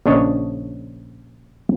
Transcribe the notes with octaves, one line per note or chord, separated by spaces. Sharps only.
A#1 C#3 D4 C#5 D#5